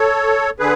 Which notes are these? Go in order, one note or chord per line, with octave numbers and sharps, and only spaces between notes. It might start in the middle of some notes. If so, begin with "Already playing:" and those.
Already playing: A4 C#5
D3 G#4 B4